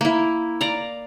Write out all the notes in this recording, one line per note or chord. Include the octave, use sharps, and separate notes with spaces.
A#3 E4
D5 F5 A#5